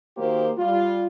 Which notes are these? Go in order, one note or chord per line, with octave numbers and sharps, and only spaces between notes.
D#3 A#3 F#4 G4 C5
G3 F4